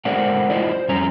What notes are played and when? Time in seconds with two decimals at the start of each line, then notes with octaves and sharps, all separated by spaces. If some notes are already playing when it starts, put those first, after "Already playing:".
0.05 G#3 A3 A#4 C5 D5 F#5
0.50 E4 F4 C5 D5 D#5
0.70 C5
0.88 F2 G3 C#4 C#5 A#5